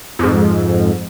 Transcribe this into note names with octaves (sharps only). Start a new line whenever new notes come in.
F2 G#2